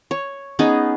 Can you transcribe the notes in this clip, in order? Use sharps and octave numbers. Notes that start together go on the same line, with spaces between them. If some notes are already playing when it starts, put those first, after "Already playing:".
C#5
B3 C#4 D#4 G#4